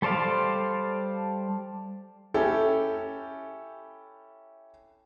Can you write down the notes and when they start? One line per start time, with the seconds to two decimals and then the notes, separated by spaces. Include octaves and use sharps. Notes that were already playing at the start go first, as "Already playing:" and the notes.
0.02 G3 A4 C5 D5 F5
2.34 C#4 E4 G4 A4